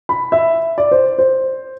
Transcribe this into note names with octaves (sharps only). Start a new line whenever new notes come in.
B5
E5
D5
C5
C5